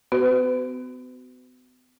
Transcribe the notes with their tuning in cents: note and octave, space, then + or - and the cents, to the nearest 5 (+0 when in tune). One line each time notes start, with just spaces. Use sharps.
B3 +40 F#4 +25 B4 +40